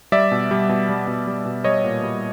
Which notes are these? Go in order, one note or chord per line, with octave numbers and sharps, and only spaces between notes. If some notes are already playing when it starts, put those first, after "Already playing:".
G3 D5 E5
B2
G3
B2
G3
B2
G3
B2
G3 C#5 D#5
A#2
G3